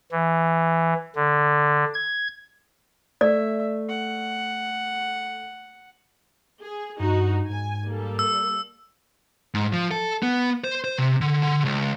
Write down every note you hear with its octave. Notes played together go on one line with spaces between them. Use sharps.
E3
D3
G#6
A3 D5 E5
F#5
G#4
G2 D#4 F#4
G#2 G#5
G3 A#3 A4
E6
G#2
F3
A4
B3
C5
C5
C3
D3
D3
C#2